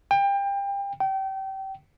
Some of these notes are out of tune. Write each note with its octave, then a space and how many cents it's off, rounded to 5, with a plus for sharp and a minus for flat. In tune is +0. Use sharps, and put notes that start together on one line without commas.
G5 +25
G5 -30